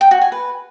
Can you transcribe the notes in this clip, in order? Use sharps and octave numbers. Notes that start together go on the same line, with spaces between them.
G5
F#4
G#5
B4